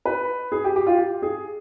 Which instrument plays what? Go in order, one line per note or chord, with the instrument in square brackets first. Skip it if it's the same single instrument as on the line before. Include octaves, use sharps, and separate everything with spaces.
[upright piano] B4
G#4
G4
G4
F4
G4
G#4